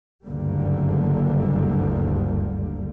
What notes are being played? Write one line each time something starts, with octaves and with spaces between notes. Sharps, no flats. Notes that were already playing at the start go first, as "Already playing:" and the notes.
F#1 D2 G2 D3 G3 A#3